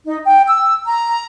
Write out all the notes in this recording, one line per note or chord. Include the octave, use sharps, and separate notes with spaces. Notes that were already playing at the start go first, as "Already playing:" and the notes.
D#4
G5
E6
A#5